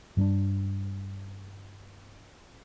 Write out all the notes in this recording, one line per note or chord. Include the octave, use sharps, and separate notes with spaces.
G2 G3 C#4 D4